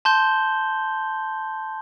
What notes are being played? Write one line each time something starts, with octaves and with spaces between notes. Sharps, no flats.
A5 C6 G6 G7